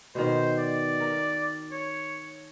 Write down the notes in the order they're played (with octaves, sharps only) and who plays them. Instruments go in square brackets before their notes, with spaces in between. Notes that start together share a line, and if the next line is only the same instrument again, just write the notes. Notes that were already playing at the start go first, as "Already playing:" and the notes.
[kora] B2 D#3 [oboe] C5
[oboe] D5
[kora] A#4
[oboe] C#5